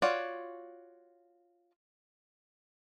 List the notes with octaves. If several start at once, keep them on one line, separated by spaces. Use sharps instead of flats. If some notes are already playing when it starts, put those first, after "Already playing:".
F4 F#4 C#5 D5